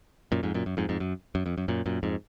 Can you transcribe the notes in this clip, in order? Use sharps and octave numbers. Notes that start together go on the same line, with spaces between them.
F#2 A#2
F2 G#2
F#2 A#2
F#2
F2 G#2
F2 G#2
F#2
F#2
F2
F#2
F#2 A#2
F#2 A#2
F2 G#2